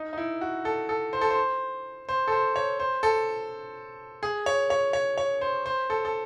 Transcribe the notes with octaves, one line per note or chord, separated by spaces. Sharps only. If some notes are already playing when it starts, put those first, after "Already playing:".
Already playing: D#4
D#4
E4
F#4
A4
A4
C5
A4
C5
C5
A4
C5
C#5
C5
A4
G#4
C#5
C#5
C#5
C#5
C5
C5
A4
A4